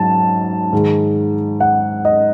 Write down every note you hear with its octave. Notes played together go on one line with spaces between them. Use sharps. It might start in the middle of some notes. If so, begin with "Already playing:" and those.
Already playing: G#2 F#3 A5
G#2 D#3 G#3
F#5
D#5